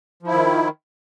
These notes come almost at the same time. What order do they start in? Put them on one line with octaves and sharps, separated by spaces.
F3 E4 D#3